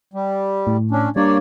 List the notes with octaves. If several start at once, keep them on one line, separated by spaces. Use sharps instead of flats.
G3
A2
C#4 D4
G3 A#3 D4 C#5 D5